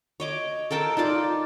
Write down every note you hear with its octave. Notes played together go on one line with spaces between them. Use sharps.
C#5 D#5 D6
A4 A#4 G5 A5
D#4 F4 D5 D6